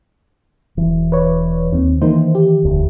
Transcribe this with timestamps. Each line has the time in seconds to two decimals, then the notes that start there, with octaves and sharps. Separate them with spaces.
0.77 E1 E3
1.12 B4 C#5 D5
1.73 D#2 D#3 C4
2.02 D#3 E3 A#3 D#4 C5
2.35 G4
2.64 E1 D2